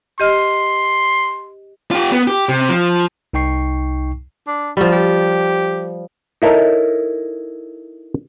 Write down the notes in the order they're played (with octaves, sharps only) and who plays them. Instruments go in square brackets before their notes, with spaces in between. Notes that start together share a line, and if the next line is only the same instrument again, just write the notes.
[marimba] G4 D#5 F6 [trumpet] C6
[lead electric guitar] F4 G4
B3
G4
C3
F3
[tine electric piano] C2 D#4 G5 C#6 C7
[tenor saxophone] D4
[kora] F3 G3 [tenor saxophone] F#4
[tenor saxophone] G4
[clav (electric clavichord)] D#4 E4 A4 A#4 C#5 D#5